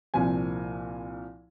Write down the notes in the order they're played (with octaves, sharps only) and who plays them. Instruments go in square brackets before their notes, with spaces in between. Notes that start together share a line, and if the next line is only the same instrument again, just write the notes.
[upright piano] C2 A#2 F3 G#5